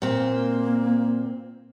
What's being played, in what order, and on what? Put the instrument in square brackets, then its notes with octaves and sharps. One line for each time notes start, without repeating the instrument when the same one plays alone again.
[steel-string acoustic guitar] A#2 C4 [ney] A#3